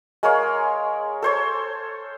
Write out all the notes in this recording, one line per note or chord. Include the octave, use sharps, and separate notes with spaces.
G#3 A#4 C#5 F5
A4 C5 C#5